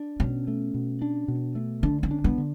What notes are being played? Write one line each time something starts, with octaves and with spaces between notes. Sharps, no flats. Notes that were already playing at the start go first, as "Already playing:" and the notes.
Already playing: D4
B2 C#4
A3
B2
D4
B2
A3
D3 D4
C#4
D4
B3
D3